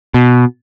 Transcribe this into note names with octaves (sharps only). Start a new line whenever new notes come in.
B2